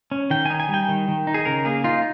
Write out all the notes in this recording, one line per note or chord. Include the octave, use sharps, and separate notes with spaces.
C#4
D#3 G5
D#4 G#5
G#5
G3
G5
D#3
D#3
D#4
G#4
C#3 A#4
A#3 G#4
D#4 F4